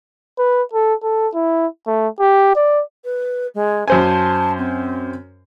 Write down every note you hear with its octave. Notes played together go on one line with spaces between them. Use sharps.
B4
A4
A4
E4
A3
G4
D5
B4
G#3
F#2 C5 G#5 A5
C4